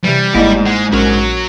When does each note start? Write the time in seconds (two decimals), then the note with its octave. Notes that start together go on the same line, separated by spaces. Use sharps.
0.04 C3 E3 G3
0.35 G1 G#2 A#3 E4 D5 D#5
0.66 G#3 F#5
0.93 A#1 F#3 C#4 F#4 A#4